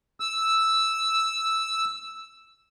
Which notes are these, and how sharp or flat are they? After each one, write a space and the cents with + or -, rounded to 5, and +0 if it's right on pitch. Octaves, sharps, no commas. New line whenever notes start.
E6 -5